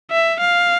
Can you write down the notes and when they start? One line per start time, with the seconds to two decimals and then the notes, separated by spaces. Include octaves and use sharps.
0.11 E5
0.40 F5